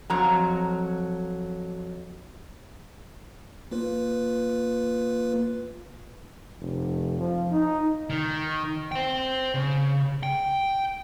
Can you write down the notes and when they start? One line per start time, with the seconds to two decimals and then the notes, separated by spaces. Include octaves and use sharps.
0.10 F2 F#3 A#5
3.71 A#3 F4 B4
6.60 F1
7.19 F3
7.52 D#4
8.10 D#3
8.92 C5 G5
9.54 C#3
10.23 G5